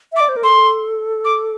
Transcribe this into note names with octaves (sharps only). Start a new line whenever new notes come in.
E5
D6
D5
C5
A#4
A4 C6
D6